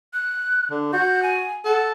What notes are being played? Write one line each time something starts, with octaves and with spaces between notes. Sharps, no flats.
F#6
D3
F#4 G6
G#5
A4 F#5